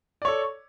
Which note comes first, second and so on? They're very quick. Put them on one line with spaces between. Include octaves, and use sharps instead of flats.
D5 C#5 A4